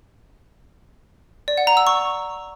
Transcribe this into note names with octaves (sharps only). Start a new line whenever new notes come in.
D5
F#5
A#5
E6
C#6